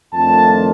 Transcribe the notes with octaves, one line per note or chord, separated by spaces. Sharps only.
F2 D#3 A3 D4 F4 A5